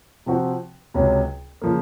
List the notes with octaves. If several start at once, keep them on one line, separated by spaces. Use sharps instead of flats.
C3 F3 C4 F#4
C#2 C3 F#3 C#4
C#3 F3 A#3